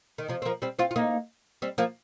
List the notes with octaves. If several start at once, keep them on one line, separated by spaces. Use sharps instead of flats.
D#3
C3 F3
C4
F3 A#3
G3 C4
C4 F4
F4
A#3 D#4
G3 C4
F3 A#3